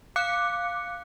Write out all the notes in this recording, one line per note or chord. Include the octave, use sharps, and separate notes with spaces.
F5 D6 F#6 C#7